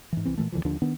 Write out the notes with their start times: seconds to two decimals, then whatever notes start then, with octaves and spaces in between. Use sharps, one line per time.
0.13 G#2 E3
0.25 C2 E3 C4
0.38 A#2 D3 E3 A3
0.52 D#2 D3 E3 F3
0.65 D#2 D3 F3 D4
0.82 D#3 B3 D4